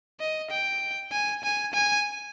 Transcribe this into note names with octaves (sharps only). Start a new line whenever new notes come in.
D#5
G5
G#5
G#5
G#5